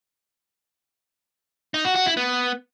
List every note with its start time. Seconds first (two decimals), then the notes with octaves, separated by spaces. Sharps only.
1.74 D#4
1.85 F#4
1.95 F#4
2.06 E4
2.17 B3